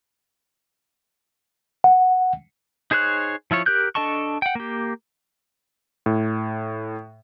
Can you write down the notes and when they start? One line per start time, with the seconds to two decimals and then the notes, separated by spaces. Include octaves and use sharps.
1.84 F#5
2.91 D#4 G#4 C5 C#5 F#6
3.51 F3 E4 F4 C#5
3.66 G4 A#4 F#6 G6
3.95 D4 A4 D#5 A5 C#6
4.42 F#5 G5
4.55 A#3 G4
6.06 A2